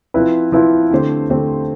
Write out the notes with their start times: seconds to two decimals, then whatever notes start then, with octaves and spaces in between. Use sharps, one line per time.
0.14 F3 C4 E4 B4
0.52 F3 C4 E4 B4
0.91 D3 A3 C4 G4 C5
1.30 D3 A3 C4 G4 C5